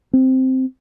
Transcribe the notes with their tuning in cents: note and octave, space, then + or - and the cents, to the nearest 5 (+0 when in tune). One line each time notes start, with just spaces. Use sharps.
C4 -5